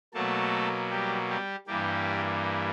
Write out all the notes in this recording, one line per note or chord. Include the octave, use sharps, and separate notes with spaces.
B2 F#3 A3 A#3 A4
G3 G4
G3 G4
G2 E3 G3 A#3 G4